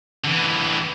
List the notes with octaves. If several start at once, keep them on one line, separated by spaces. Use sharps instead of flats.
D3 E3